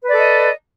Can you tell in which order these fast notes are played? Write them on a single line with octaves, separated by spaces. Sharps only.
B4 D5 A4 D#5